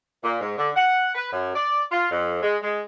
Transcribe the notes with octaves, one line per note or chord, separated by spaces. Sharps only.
A#2
G#2
D3
F#5
B4
F#2
D5
F4
F2
G#3
G#3